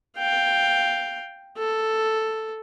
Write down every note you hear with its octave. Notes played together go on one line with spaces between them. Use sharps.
F5 G5
A4